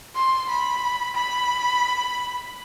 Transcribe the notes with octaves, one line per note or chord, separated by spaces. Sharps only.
C6
B5
B5